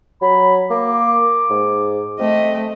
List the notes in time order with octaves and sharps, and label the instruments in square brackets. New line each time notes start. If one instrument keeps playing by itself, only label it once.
[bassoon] F#3 [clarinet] B5
[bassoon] A#3 [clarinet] D6
[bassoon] G#2
[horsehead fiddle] A3 D#5 [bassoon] C4